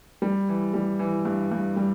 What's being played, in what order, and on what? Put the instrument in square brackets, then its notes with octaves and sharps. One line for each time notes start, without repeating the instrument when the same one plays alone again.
[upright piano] G3
E3
G3
E3
G2
G2
G3